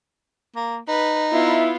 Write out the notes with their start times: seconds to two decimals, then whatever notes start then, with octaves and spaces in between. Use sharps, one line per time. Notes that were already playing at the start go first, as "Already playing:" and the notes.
0.56 A#3
0.88 D#4 B4
1.31 B3 E4 F4